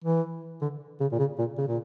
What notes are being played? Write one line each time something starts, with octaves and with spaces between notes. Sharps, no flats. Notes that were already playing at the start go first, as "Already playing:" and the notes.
E3
D3
C#3
A#2
C#3
A#2
C#3
A#2